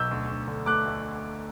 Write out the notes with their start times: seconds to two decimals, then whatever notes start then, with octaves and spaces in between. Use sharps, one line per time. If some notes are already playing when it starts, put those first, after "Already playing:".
Already playing: B1 E6 G6
0.11 D2
0.30 D2
0.48 D3
0.66 A3 D6 F#6
0.85 D2